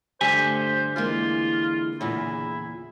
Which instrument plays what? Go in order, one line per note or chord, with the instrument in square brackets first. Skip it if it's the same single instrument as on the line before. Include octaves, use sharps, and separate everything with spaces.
[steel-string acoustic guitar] G2 G3 A3 [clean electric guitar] D3 G4 G#5 [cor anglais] C5
[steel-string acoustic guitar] E3 G#3 A#3 [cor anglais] F4
[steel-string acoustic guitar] E2 A#2 C#3 [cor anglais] E4